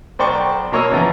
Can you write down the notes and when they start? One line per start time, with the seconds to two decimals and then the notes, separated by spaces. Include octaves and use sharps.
0.19 B1 C5 D5 G5 C#6
0.72 B2 A#3 C#5 D#5 E6
0.91 C#3 E3 F3 B3 A#5